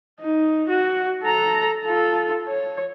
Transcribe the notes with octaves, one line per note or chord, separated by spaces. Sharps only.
D#4
F#4
A4 A#5
F4 A4
C#5